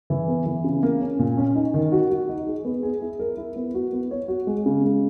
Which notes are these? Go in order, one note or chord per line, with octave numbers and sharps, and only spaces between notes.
E3
B3
E3
C#3
A#3
C#4
A#2
C#4
D#4
D#3
F#4
F#4
D#4
G#4
B3
G#4
E4
A#4
E4
B3
F#4
B3
C#5
F#4
G#3
C#3
G#3